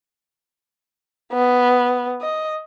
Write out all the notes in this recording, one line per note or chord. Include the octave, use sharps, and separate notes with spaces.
B3
D#5